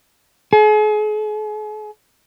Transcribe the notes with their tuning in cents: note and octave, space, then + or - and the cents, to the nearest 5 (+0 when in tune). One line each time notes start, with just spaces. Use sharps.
G#4 +40